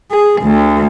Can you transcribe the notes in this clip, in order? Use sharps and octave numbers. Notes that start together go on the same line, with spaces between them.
G#4
D2